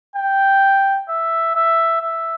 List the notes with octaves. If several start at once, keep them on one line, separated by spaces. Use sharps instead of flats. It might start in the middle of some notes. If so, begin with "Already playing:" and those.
G5
E5
E5
E5